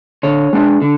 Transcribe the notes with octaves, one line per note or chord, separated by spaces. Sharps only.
D3 C#5
G#3 D4
D3